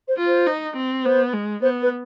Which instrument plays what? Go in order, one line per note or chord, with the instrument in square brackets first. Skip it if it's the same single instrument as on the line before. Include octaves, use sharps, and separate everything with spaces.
[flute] C5
[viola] F4
[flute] C5
[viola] D#4
C4
[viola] B3 [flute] C5
[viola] G#3
[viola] B3 [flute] C5
[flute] B4